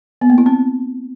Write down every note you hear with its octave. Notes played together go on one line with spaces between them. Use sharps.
B3
A#3
E4
C4